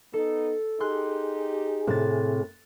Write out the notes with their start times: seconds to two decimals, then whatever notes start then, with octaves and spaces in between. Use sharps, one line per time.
0.13 B3 D#4 A4
0.80 D#4 G4 G#4 C6 F#6
1.87 A2 C3 F#6 A6